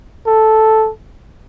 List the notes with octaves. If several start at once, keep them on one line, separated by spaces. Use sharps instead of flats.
A4